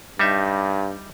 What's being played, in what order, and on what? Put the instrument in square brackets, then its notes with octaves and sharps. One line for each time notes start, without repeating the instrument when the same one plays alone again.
[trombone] G2 [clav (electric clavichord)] G3 D#4 E5